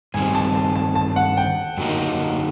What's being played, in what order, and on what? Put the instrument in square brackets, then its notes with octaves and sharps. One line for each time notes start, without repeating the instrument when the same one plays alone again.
[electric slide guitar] G2 D#3 G3 C4 [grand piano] G#5
[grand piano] A5
A5
A5
A5
F#5
G5
[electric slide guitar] F#2 D3 F#3 A#3 D#4